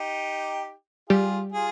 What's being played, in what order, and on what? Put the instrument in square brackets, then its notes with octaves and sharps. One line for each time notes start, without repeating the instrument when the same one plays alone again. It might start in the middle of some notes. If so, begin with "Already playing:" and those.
Already playing: [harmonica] D#4 G4
[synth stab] G3 G4 [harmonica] F4 G#4
[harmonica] F4 G#4